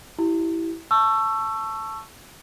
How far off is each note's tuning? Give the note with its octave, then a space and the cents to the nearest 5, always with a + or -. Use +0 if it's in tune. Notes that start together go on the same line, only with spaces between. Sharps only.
E4 +0 G4 -25
A5 +0 C#6 +0 E6 +20